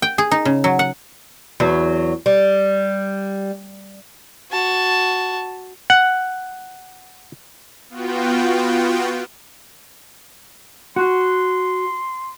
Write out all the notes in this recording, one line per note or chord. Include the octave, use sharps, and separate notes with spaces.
G5
G#4
D#4
C#3
F#3
F#5
E2 F#3
G3
F#4 A5
F#5
B3 F4 F#4 G5
F#4 F#5 C6